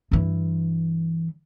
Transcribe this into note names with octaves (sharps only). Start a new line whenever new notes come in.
G2 E3